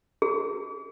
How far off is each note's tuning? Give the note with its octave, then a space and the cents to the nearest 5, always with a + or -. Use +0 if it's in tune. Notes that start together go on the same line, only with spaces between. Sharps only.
G#4 -10